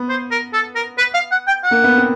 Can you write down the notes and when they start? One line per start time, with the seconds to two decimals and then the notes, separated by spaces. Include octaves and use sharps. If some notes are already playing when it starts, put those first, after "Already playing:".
Already playing: B3
0.09 C5
0.31 A#4
0.53 A4
0.75 A#4
0.98 B4
1.14 F5
1.31 F#5
1.47 G5
1.64 F#5
1.71 A#3
1.84 B3
1.98 C4